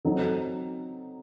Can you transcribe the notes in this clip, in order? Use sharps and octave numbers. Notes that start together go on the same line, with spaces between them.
F#3 C4 D#4 A4